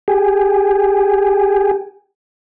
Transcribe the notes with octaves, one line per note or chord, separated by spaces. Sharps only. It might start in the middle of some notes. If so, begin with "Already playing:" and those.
G4 G#4